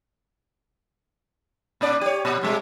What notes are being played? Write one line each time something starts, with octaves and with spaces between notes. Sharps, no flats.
A#2 C#4 D5
G4 C#5
A#2
G2 B2 G#3